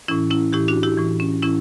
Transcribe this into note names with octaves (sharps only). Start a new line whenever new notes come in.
A2 E3 C#4 E4
C#4 E4
A2 E3 E4 G4
D4 F#4
E4 G4
A2 E3
C#4
A2 E3 C#4 E4